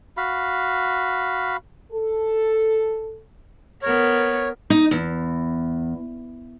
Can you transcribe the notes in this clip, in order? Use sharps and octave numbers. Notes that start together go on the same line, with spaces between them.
F#4 F5 B5
A4
B3 A#4 C#5
D#4
E2